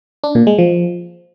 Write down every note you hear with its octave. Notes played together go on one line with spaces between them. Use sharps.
D4
A#2
G#3
F3